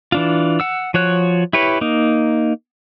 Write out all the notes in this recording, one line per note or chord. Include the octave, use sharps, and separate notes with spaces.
E3 D4 F4
F#5 E6
F3 F#4 C#5 F#6
E4 G4 B4 C#5
A#3 D#4